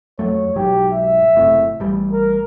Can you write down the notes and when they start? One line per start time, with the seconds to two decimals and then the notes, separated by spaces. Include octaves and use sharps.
0.19 F2 F#3 A3 C#5
0.56 B1 G#2 F#3 G4
0.92 E5
1.35 F#1 A2 C3
1.80 A1 G3
2.12 A#4